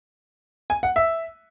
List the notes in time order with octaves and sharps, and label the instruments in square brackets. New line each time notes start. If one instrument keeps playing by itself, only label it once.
[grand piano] G#5
F#5
E5